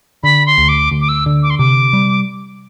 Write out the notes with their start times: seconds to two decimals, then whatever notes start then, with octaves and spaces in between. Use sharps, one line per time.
0.23 D3 B5
0.46 C6
0.58 D2
0.69 D6
0.91 D2
1.01 D6
1.09 E6
1.26 D3
1.43 D6
1.50 C6
1.58 C3 D6
1.93 G3